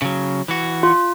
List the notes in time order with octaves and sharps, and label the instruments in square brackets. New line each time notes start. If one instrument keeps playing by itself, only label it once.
[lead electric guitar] C#3 F#3
E3 F#4
[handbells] F4